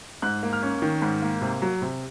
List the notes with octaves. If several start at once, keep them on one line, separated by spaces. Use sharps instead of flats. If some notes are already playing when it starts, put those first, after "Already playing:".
G#2 F#6
A#3
F6
C#4
D#3
G#2
A#3
C3
F#3
C3